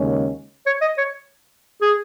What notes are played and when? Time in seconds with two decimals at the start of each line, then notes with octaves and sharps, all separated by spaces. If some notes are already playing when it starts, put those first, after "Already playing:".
Already playing: D#2 C#3 G#3 C#4
0.66 C#5
0.81 D#5
0.98 C#5
1.82 G#4